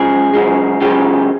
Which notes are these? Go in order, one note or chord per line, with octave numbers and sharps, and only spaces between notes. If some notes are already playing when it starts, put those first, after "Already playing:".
Already playing: F#2 C#3 F3 G#3 G#4
F#2 C#3 F3 G#3
F#2 C#3 F3 G#3 G4